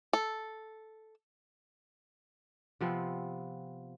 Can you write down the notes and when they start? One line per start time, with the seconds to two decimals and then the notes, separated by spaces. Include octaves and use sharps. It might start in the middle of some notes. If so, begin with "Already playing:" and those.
0.13 A4
2.81 C3 F3 B3 C4